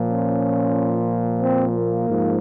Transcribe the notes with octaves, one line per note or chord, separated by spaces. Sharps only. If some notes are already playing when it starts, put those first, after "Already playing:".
Already playing: A#2 F3
C#4
C4
A#3
G#2 F3